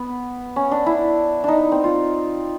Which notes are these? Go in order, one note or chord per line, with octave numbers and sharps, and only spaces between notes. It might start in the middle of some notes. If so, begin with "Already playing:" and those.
Already playing: B3
C#4
D4
E4
D4 D#4
C4
F4